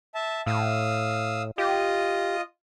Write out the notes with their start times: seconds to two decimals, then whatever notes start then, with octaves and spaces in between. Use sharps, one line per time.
0.15 E5 A5
0.47 A2 F5 D#6 E6
1.58 F4 G4 D#5 D#6